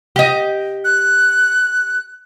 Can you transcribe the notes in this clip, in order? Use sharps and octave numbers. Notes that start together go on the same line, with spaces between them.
G4 D#5
F#6